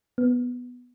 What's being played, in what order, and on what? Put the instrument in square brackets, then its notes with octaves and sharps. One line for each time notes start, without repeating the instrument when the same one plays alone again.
[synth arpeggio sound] B3